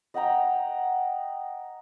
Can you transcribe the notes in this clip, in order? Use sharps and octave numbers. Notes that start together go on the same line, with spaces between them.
D#5 F#5 G5 A#5